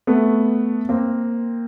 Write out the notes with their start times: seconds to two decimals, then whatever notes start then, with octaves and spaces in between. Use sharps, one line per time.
0.07 A3 B3
0.89 A#3 C4